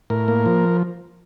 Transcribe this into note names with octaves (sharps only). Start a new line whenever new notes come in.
A2 A#4
A#3
F3